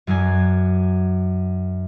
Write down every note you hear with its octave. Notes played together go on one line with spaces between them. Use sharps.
F#2 F#3 D4 G#5